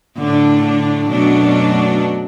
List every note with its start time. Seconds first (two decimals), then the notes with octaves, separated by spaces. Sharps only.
0.17 A2 D3 A3 D4
0.64 D3
1.10 F#2 B2 F#3 A3 D4